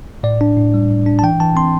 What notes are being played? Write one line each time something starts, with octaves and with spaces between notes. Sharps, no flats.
A2 D5
D4
A2
G3
A2
D4
A5
E3 G5
E3 A5
C4 C6